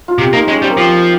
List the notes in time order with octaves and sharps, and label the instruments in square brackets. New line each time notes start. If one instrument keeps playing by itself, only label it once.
[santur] F4
[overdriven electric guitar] C3 [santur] G4
[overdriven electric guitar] A#3 [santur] D#4
[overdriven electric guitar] G#3 [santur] C#4
[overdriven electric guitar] G3 [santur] C4
[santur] A#3
[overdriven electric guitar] F3 [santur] C4